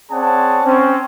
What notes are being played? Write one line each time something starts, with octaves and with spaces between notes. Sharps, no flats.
C4 G#4 C#5 D5 F#5 A5
C4 C#4